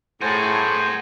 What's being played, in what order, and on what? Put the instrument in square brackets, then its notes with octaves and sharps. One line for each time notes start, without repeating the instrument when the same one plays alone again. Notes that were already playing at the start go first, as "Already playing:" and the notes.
[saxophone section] A2 [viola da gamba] A3 G#4 [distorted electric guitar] F#4 A#4 [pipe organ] C5 G#5